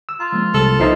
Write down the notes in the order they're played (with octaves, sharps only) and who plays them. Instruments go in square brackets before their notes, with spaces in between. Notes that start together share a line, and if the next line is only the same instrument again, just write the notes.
[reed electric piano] E6
[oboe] F4 [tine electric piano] A#5
[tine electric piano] F3 G#3 A#3
[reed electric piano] C2 [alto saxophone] A4
[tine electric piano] C2 C7 [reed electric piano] F3 D#4 E5